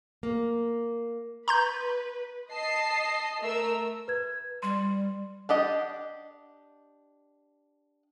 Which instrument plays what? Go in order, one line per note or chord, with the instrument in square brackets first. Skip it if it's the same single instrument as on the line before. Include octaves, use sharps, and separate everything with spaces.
[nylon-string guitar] A#3
[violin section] B4 [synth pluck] A#5 C6 G6
[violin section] D#5 A5 C7
A3 A#4 E6
[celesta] B4 G#6
[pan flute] G3 [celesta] C6
[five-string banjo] D4 G4 D#5 F#5